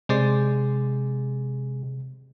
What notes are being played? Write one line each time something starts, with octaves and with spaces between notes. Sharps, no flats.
C3 G#3 C5 D5